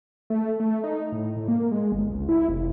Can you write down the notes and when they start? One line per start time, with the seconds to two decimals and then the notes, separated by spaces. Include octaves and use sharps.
0.30 A3
0.60 A3
0.84 D#4
1.12 A2
1.37 A2
1.48 A#3
1.71 G#3
1.92 G1
2.09 C#2
2.29 E4
2.49 F1